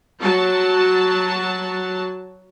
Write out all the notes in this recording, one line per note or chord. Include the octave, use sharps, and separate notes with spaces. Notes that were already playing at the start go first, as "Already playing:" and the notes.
F#3 F#4 A5